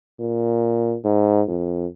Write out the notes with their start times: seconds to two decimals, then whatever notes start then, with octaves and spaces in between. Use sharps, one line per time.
0.20 A#2
1.05 G#2
1.48 F2